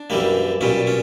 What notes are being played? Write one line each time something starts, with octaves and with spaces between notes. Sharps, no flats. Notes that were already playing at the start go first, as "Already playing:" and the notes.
Already playing: D4
F#2 E3 G3 A#3
B1 A#2 G3 C#4
C#4